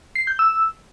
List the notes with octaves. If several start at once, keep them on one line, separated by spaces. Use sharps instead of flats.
C7
G6
E6